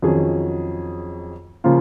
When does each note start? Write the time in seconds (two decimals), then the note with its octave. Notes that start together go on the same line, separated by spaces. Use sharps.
0.02 F2 D#3 F#3 C#4 G#4
1.64 C#3 F3 A#3 F4